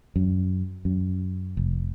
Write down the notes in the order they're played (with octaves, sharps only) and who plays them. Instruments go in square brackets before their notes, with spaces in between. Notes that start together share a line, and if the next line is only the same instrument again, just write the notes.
[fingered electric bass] F#2
F#2
F1